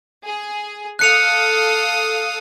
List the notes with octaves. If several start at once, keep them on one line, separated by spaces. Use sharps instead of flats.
G#4
A4 F5 D#6 F#6 C#7 F7